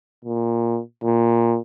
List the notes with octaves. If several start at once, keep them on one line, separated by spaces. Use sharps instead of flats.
A#2
A#2